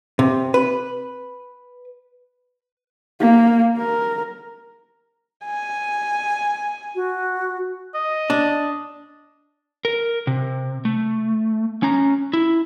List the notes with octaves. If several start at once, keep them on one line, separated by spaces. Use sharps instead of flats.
C3
B4
A#3
A#4
G#5
F#4
D#5
D4
A#4
C3
A3
C#4 A#5
E4